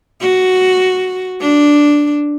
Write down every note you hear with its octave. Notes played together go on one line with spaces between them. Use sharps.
F#4
D4